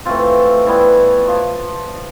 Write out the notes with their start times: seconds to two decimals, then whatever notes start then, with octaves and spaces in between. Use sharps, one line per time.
0.05 E3 A3 C4 F4
0.67 E3 G3 B3 E4
1.28 F3